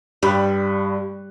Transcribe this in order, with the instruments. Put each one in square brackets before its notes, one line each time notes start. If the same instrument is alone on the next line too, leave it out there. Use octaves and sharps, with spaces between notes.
[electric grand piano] G2 B5 F#6 [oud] G3